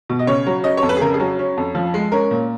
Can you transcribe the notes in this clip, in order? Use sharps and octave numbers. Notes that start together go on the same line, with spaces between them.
B2
D#5
C#3 C#5
F#3
C#4 D#5
C#5
F2
B4
G#4
C#3 A#4
G#4
F#3
C#4
F2
F3
G#3
C#4 A#4
A#2